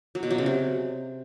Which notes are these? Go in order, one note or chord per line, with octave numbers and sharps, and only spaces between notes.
F#3
B2
F#3
C#3
C3